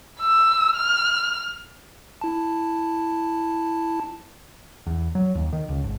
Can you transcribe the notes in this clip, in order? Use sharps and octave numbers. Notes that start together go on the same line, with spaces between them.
E6
F6
E4 A5
E2
F#3
D#2
D#3
C#2
G#1